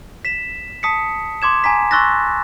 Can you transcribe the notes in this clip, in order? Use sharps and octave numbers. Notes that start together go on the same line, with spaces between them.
B6 E7
A5 D#6 B6 C#7
C6 D6 G#6 E7
G#5 A#5 B6
C6 C#6 E6 F#6 A6 A#6